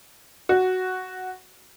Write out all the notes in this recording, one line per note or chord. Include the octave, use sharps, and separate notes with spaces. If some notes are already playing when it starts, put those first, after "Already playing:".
F#4